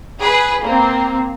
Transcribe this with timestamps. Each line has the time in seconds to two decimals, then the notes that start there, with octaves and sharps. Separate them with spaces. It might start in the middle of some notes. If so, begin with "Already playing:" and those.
0.20 G#4 B4
0.63 A#3 C4